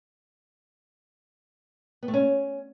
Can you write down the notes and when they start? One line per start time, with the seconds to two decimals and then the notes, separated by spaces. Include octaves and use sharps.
2.03 B3
2.08 A3
2.14 C#4